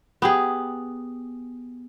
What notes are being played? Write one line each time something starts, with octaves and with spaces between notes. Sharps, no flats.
B3 G4 G#4